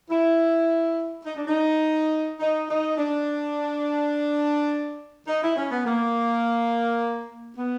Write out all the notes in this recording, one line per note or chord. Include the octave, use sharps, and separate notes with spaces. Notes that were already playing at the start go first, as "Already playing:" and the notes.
E4
D#4
D4
D#4
D#4
D#4
D4
D#4
E4
C#4
B3
A#3
B3